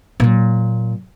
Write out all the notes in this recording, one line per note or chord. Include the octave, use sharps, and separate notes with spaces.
A#2 F#3